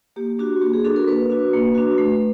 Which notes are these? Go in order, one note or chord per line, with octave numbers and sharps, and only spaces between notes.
A#3 G4
D4 F#4 G4
A#3 G4
G#4
D4 F#4 A4
A#4
A#3 B4
D4 F#4
A#3
D4 F#4
A3